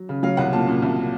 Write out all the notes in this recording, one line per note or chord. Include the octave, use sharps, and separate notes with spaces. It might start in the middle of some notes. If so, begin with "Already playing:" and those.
Already playing: F#3
C#3
F#3 F5
C2 F#5
A#2 A5
A#2
C2